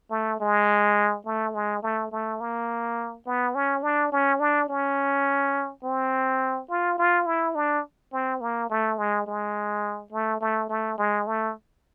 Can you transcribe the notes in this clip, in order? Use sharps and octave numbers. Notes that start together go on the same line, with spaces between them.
A3
G#3
A3
G#3
A3
A3
A#3
B3
C#4
D4
C#4
D4
C#4
C4
F4
F4
E4
D4
C4
A#3
A3
G#3
G#3
A3
A3
A3
G#3
A3